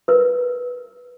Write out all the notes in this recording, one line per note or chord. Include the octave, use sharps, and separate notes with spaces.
A#4 B4